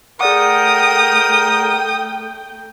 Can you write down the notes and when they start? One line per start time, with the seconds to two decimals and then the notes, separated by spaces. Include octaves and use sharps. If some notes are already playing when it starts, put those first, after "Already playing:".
0.21 A3 G#4 A#4 D5 F#5 G5 D#6